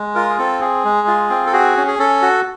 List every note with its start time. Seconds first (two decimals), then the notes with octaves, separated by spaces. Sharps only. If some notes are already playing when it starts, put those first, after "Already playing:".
Already playing: G#3
0.15 F4 A#4
0.29 G#4
0.39 C4 A4
0.61 G#4
0.85 G#3
1.07 F4
1.30 C4
1.46 A4
1.53 F#4 G#4
1.77 C#4
1.88 G#4
1.99 C#4 A4
2.22 F#4